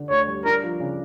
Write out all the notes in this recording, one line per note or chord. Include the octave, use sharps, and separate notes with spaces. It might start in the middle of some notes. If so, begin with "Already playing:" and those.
Already playing: D3 D4
D2 C#5
G3
D4 A#4
F3
C#3